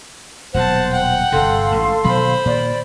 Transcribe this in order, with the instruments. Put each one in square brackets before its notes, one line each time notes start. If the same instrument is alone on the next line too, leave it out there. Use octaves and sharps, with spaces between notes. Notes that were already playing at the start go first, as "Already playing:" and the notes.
[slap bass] D#1 B2 F#3 [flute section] C5 [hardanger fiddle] F#5 A5
[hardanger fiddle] F#5 G5
[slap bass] G1 G2 C3 [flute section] A4 F5 C6
[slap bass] A1 G#2
[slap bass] B2 D#3 F#3 [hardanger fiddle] C5 B5
[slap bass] A#2 D#3 [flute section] D5